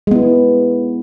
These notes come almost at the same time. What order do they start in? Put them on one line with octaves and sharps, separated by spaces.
G#3 B3 E4